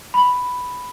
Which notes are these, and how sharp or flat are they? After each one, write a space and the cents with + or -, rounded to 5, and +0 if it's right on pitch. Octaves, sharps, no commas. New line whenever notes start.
B5 +5